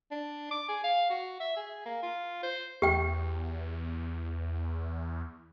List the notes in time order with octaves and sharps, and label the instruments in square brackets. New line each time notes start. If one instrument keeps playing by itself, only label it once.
[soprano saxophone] D4
D6
G#4
F5
F#4
E5
G#4
A#3
F4
C5
[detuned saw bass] E2 [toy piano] G4 G5